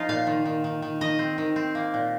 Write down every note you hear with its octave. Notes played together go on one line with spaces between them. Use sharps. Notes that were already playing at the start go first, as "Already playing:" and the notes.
Already playing: F3 A#3 D#4 F4
A#2 F5
D#3
D#3
D#3
D#3
D#3 D#5
C4
D#3
C4
A#3
A#2